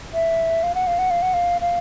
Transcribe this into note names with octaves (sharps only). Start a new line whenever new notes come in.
E5
F5
F#5
F5
F#5
F5
F#5
F5
F5